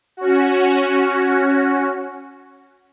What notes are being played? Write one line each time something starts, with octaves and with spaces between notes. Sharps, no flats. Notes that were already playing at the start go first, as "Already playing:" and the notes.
C#4 F#4